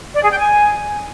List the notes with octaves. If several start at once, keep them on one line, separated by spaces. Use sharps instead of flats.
D5
G#4
G5
G#5